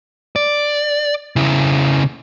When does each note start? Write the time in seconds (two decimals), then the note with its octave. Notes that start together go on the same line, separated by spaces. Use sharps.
0.36 D5
1.36 C#3 E4